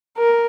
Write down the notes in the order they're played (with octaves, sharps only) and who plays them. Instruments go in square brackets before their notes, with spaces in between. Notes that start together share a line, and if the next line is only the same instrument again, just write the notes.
[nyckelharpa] A#4